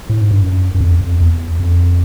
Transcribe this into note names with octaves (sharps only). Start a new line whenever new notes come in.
A2
G#2
G2
F#2
F#2
F2
F2
E2
F2